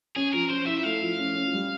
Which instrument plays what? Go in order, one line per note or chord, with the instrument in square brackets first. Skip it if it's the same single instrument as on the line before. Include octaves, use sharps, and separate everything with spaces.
[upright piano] C#4 [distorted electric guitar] G#4
[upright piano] F3 [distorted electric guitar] A#4
[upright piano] C#4 [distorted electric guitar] C5
[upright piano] E4 [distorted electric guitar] E5
[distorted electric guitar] E5
[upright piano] A3 [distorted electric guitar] F5
[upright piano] F3
C#4
C#4
G3